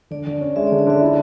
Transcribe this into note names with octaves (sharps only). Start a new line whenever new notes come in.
D3 D5
D3
C#4
G#3 E5
D5
D3
D5
D3 E5
E4